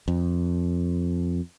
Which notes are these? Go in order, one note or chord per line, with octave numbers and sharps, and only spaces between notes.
F2